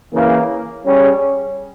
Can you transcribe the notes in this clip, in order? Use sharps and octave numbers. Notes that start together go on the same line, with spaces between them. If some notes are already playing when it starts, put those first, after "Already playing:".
C#3 E3 A#3
G3 C#4 G#4 C#5